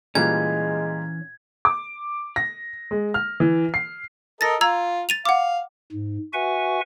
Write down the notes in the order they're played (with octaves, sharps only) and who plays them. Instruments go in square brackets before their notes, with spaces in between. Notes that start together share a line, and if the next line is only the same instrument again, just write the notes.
[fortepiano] A#2 G3 F4 [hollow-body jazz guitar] E3 C#4 [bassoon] G#3 [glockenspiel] G#6
[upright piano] D6
A#6
G#3
F6
E3
C7
[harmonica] A4 A#4 D#5 [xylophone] A6 A#6
[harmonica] F4 [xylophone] A#5 E6 G#6
[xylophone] A6 D#7 F7
[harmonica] F5 [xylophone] F#5 D6
[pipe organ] G#2
F#4 B4 E5 F#5 G#5 C#6